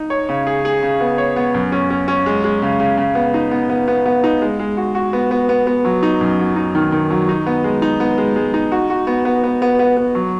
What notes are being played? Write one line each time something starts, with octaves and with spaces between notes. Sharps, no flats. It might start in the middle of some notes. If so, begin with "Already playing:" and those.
Already playing: D#4
C#5
C#3
G#4
G#4
C#3
B3
C#5
B3
F#2
C#4
C#4
C#4
G#3
G#3
C#3
C#3
C#3
B3
D#4
B3
B3
B3
B3
D#4
G#3
G#3
F#4
F#4
B3
B3
B3
B3
F#3
D#4
F#2
F#3
D#4
D#3
D#3
F#3
D#4
B3
G#3
D#4
B3
G#3
G#3
D#4
F#4
F#4
B3
B3
B3
B3
B3
B3
F#3